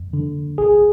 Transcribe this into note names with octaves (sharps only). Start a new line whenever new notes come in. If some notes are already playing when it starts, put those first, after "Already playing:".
Already playing: F2
D3
A#1 G#4